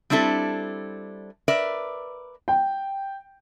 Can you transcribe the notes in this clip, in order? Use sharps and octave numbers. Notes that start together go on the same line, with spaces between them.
G3 C4 D4 E4 A4
A#4 B4 D5 E5
G5